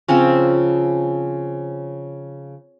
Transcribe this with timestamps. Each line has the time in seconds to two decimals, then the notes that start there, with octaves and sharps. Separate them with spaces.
0.08 C#3 F3 C4 C#4